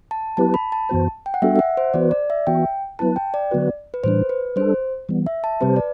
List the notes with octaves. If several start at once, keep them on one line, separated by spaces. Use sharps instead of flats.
A5
F#3 B3 E4 G4 B4 A5
B5
A5
F#2 E3 B3 F#4 C5
G5
F#5
G3 B3 D4 F#4 A4 E5
E5
F#5
C5
E3 B3 F#4 B4 D5
D5
E5
E3 B3 F#4 G5
F#3 B3 E4 B4 A5
G5
D5
D3 F#3 B3 F#4 B4
B4
A2 E3 G3 D4 C5
B4
G3 D4 A4 C5
E3 G3 B3
E5
A5
C3 G3 C4 G4 B4 C5
D5